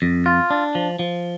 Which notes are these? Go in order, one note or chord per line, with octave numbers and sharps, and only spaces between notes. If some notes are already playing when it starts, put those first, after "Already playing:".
F2
F4
D4
F3
F3